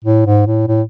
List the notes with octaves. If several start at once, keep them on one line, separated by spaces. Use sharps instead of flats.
A2
G#2
A2
A2